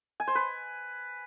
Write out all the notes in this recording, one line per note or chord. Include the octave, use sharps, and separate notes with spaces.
G#5
C5
B4